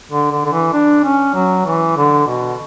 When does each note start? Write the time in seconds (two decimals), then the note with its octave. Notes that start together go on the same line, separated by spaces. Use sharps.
0.11 D3
0.31 D3
0.45 D3
0.52 E3
0.73 D4
1.04 C#4
1.34 F#3
1.65 E3
1.96 D3
2.27 B2